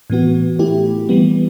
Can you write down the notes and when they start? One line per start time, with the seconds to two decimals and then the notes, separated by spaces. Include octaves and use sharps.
0.10 A2 E3 B3 F#4
0.59 A3 E4 G4
1.09 E3 G3 B3